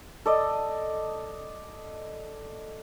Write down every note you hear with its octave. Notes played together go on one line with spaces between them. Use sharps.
A4 D5 D#5